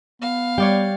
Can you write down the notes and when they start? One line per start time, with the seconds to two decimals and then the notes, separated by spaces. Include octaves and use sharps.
0.22 B3 F5
0.58 G3 C#5 D5 G5